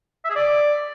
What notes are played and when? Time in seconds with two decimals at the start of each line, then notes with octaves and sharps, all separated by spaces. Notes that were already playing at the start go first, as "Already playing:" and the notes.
0.25 E5
0.30 G#4
0.35 D5